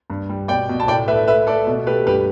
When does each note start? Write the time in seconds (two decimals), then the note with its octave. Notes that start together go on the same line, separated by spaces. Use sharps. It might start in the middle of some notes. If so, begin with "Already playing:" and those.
0.10 G2
0.30 G3
0.48 B2 D5 G5
0.69 B2
0.80 A5
0.88 A2 D5 G5
1.07 A3 B4 E5
1.27 A3 B4 E5
1.47 A3 A4 D5
1.67 B2
1.86 A3 G4 B4
2.07 G2 G4 B4